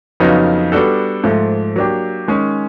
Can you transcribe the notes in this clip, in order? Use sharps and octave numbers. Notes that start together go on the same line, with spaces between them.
F2 C#3 F#3 B3 D#4
G3 B3 D4 F#4 A4
G#2 F3 A3
F#3 A#3 D4 G4
D#3 G#3 C#4